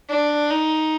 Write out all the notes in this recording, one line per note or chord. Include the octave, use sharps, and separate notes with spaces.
D4
D#4